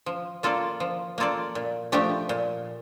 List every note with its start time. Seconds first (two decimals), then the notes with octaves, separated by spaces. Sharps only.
0.06 F3
0.43 A#3 F4 A4 D5
0.80 F3
1.18 A#3 F4 A4 D5
1.55 A#2
1.92 F3 A3 D4 G4
2.29 A#2